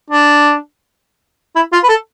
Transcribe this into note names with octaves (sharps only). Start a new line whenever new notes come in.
D4
E4
F4
B4
A4